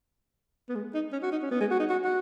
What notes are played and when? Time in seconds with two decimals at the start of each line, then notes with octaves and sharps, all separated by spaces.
0.69 B3
0.75 G#3
0.94 D#4
1.13 C#4
1.23 F#4
1.32 D#4
1.42 C#4
1.51 B3
1.61 G#3
1.71 F#4
1.80 D#4
1.89 F#4
2.04 F#4